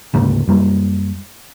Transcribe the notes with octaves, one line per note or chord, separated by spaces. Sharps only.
D2 G#2 C#3 A#3
F#2 G3 A#3